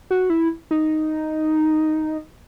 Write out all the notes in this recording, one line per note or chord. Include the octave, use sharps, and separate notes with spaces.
F#4
E4
D#4